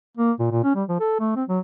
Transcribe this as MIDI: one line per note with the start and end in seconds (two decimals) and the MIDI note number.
0.17 0.32 58
0.39 0.47 46
0.51 0.61 46
0.64 0.74 61
0.75 0.84 55
0.89 0.99 53
1.00 1.19 69
1.20 1.35 57
1.36 1.44 60
1.49 1.59 54